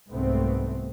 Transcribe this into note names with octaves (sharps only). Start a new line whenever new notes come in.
C2 G#2 A3 B3 C4